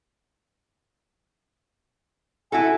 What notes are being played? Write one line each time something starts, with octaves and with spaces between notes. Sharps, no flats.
E4 F#4 A4 G#5